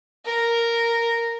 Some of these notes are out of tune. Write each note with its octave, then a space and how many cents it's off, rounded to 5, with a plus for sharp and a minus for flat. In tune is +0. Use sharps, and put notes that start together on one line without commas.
A#4 -5